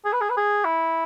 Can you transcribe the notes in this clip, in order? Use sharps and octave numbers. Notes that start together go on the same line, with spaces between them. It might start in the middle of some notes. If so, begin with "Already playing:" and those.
G#4
B4
G#4
B4
G#4
E4